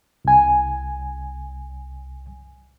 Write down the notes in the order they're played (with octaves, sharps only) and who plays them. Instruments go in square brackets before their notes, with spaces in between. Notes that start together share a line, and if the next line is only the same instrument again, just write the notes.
[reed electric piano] C2 G#5